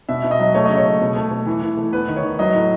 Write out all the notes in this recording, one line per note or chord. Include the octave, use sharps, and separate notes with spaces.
B2 E5
B2
D#5
F#3
A3 C#5
C#3 D#5
C#5
A3
B2
A3
A3
E3
E3
A3
B3 B4
D#3
C#5
D#3
F#3 D#5
A2